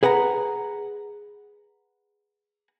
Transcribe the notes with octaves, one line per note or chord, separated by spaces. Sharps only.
G#4 B4 F#5 G5 A#5